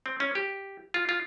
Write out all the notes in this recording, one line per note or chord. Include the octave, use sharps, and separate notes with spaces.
C4
C#4
G4
F4
F4